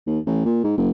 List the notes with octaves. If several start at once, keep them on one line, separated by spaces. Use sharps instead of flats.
D#2
A1
A#2
G#2
F#1